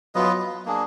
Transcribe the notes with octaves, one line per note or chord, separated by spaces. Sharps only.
F#3 B3 F4 B4 D#5
A#3 D4 G#4